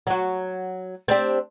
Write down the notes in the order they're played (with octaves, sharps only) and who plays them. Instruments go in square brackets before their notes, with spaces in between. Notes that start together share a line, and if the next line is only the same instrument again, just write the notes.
[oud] F#3 F#4
C4 D4 G4